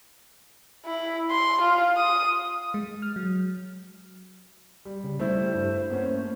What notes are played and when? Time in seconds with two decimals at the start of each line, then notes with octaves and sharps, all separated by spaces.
0.86 E4
1.30 C6
1.62 F4
1.97 D#6
2.74 G#3
3.02 F6
3.16 F#3
4.85 G3
5.04 C#3
5.19 G3 A3 E4 C5
5.55 G2
5.90 A#3 B3 C#4
6.10 A3